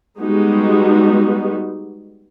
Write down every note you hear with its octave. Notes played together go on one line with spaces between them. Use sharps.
G3 G#3 B3 D#4 F#4 G4